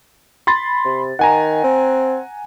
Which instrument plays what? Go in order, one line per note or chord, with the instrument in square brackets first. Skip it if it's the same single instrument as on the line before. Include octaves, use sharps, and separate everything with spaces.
[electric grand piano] B5 C6 A6
[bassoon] C3
[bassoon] D#3 [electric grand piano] F#5 G#5 A#5
[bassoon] C4